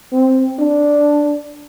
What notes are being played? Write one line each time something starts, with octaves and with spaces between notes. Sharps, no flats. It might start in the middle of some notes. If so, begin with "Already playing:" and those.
C4
D4